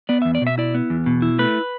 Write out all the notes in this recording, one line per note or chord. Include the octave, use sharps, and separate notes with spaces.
B3 D5
E2 E5
D5
B2 E5
E4 D5
B3
E2
B2
E4
A3 B4